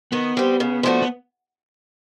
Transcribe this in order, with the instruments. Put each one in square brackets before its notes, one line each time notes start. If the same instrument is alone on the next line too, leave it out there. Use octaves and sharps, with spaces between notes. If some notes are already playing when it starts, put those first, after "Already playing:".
[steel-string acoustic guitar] D#3 [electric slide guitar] B3
[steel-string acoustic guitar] G3 C4
C#3
F3 A3 D4 F#4
[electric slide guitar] B3